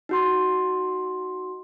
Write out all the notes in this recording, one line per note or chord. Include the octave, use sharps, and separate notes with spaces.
D#4 F#4 C6